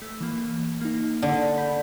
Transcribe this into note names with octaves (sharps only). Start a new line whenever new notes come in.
A3
E3 A#3
A#3 D#4
D3
B5 G6 B6